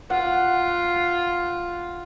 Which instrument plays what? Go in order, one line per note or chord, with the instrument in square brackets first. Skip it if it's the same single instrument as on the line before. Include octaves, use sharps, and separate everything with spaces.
[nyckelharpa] F4 [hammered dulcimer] F#5